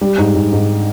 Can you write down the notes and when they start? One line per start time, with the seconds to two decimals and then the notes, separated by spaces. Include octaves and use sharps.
0.01 G3
0.18 G#2
0.35 G#2
0.53 G#2